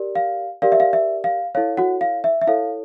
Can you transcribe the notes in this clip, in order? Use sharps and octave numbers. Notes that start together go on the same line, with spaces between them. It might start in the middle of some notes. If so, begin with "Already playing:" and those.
Already playing: G4 A#4 D5
F5
G4 A#4 D5 F5
E5
F5
E5
F5
E4 A4 C#5 F5
F#4 F#5
F5
E5
E5
E4 A4 C#5 F5